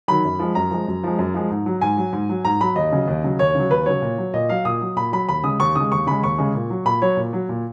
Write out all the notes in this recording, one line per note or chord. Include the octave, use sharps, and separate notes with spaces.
D#3 F#3 B5
F#2
F3 G#3
F#2 A#5
F3 G#3
F#2
F3 G#3
F#2
F3 G#3
G#2
F#3
G#2 G#5
F#3
G#2
F#3
G#2 A#5
F#3 B5
D#2 D#5
C#3 F#3
D#2
C#3 F#3
D#2 C#5
C#3 F#3
D#2 B4
C#3 F#3 C#5
A#2
F#3
A#2 D#5
F#3 F5
A#2 D#6
F#3
A#2 B5
F#3 B5
D#2 B5
C#3 G#3 D#6
D#2 C#6
C#3 G#3 D#6
D#2 C#6
C#3 G#3 B5
D#2 C#6
C#3 G#3
A#2
F#3
A#2 B5
F#3 C#5
A#2
F#3
A#2